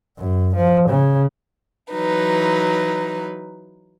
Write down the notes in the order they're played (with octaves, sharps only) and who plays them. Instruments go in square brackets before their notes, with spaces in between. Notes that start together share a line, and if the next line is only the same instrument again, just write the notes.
[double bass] F#2
F3
C#3
[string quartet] E3 F#3 D#4 B4